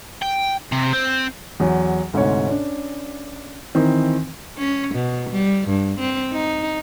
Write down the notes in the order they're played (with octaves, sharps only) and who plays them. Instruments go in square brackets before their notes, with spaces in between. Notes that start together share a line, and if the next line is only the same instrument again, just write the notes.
[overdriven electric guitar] G5
C3
C4
[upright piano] E2 F#3
D2 G#2 C3 C#5
C#4 D4
D#3 E3 C4
[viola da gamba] C#4
B2
G3
G2
C4
D#4